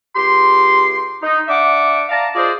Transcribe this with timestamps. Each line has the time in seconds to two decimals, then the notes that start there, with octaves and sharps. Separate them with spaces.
0.16 C#2 G4 C6
1.22 D#4
1.48 D4 E5 F#5 D6
2.09 D5 F5 A5 A#5
2.35 F4 G#4 C5 D5 D#5